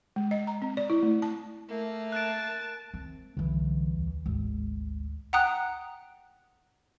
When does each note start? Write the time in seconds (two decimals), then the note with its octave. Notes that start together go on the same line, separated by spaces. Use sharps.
0.16 G#3
0.31 D#5
0.47 A#5
0.62 C4
0.77 D5
0.90 E4
1.02 A3
1.22 A5
1.69 A3 A#3
2.12 A5 F#6 A6 D7
2.94 C4
3.37 C2 D3 E3
3.94 D#2
4.26 G#1 D2
5.33 F#5 G5 A#5 D#6 F#6